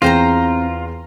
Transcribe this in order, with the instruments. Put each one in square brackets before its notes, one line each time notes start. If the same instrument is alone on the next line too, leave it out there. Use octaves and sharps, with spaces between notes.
[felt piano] E2 G#4 A#6 [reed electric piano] C4 [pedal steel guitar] F4 [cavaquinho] C5 G5 A#5